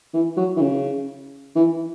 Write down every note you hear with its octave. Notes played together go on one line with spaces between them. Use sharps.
E3
F#3
E3
C#3
E3